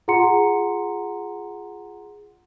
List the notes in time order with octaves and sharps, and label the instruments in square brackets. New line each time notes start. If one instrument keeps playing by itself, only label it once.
[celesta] F4 G#4 F#5 A#5 C6 C#7